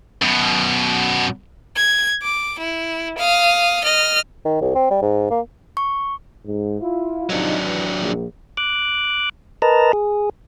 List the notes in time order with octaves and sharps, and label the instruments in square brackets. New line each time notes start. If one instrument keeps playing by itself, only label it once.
[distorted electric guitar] F#2 B2
[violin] G#6
D6
E4
F5 D#6
D#5 F6
[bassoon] D#3
C2
C4
G3
G#2
A#3
[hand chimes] C#6
[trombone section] G#2
E4 F4
[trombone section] C3 F3 D#4 [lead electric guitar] F#3 D4
[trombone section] E3
A#1
[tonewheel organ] D6 F#6
A#4 B4 D#5 A5 A#5
G#4